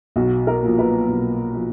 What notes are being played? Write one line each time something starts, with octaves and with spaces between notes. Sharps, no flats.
B1 F#4
A#4
A#2 F3
B4
B1
F3